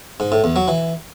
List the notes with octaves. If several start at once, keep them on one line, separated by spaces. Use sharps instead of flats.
G#2
A2
E2
F#3
E3